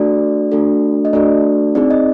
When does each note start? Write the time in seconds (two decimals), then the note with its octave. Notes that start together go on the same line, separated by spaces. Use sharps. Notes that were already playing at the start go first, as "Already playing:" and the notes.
Already playing: A3 D4 F#4 A4 D5
0.51 A3 D4 F#4 A4
1.05 D#5
1.13 A3 D4 F#4 A4 D5
1.75 C4 D#4 G#4 D5
1.91 D#5